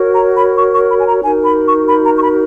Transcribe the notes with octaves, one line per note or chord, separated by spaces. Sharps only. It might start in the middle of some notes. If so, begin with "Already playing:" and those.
Already playing: F#4 A#4 C#5
A#5
B5
C#6
C#6
B5
G#5
A#5
D#4 F#4 A#4 G#5
B5
C#6
B5
A#5
C#6
B5